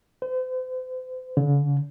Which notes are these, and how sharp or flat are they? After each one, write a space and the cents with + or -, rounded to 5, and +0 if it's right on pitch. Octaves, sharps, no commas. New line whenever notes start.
C5 -40
D3 -45